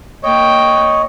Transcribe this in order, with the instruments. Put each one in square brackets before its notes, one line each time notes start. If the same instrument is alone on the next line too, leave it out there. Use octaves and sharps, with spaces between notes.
[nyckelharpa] A#3 G5 [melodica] C#5 D#5